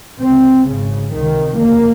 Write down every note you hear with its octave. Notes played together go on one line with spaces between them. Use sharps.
C#2 C3 C4
G#1 G#2 C#3
C#2 C3 D#3
F1 D#2 C#3 A#3